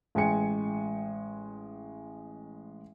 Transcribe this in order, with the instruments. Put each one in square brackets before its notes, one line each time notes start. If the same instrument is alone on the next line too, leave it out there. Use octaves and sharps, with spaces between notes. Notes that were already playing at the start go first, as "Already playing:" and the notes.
[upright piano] A1 G#3 G5 G#5 C#7